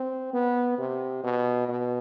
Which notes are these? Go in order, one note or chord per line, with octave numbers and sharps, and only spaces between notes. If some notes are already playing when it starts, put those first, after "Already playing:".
Already playing: C4
B3
C3
B2
B2